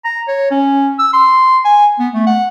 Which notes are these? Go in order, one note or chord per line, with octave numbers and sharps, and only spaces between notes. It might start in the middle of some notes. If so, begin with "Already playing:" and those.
A#5
C#5
C#4
E6
C6
G#5
B3
A3
F#5